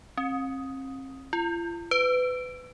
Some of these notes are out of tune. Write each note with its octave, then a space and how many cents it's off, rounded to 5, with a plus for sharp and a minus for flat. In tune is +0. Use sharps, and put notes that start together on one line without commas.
C4 +40
F4 -45
B4 +25